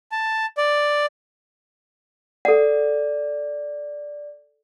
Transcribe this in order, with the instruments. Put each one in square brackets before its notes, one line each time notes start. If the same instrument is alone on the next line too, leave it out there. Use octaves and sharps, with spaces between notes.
[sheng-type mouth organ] A5
D5
[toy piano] A4 F#5 [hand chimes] D5